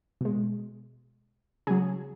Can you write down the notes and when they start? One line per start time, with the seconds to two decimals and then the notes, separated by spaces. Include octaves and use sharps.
0.21 B2 G#3
1.67 C#3 F#3 G#4